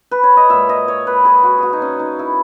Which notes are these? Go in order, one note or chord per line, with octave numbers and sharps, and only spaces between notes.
B4
C#5
D#5
A#2 G#3 E5
D#5
C#5
B4
G#4
F#4
F#4 G#4
D#4
C#4
D#4
E4